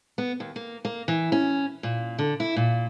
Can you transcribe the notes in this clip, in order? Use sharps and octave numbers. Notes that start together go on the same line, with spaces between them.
B3
D#2
A#3
A#3
E3
C#4
A#2
D3
E4
A#2